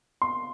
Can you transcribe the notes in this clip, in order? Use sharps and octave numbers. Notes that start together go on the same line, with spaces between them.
C6